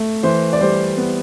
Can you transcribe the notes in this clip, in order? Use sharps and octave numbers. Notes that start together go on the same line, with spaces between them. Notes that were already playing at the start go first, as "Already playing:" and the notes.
Already playing: A3
E3 C5
D5
G3 C5
B3